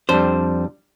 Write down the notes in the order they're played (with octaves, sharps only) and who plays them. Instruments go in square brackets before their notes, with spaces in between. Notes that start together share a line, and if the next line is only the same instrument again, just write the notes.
[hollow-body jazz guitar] F2 C5 [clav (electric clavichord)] G3 D4